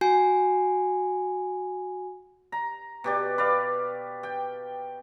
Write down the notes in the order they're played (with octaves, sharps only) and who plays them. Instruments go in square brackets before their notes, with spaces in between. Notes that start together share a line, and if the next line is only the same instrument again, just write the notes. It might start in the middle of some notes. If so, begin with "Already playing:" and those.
[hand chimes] F#4 G#5
[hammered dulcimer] A#5
B2 G4 D5
B4 D5 F5
G5